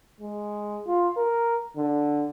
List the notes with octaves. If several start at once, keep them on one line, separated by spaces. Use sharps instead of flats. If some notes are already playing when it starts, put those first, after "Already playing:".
G#3
F4
A#4
D3